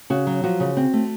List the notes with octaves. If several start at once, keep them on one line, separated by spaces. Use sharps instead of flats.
C#3 F#4
F#3
F3 F#4
C#3
C4
A3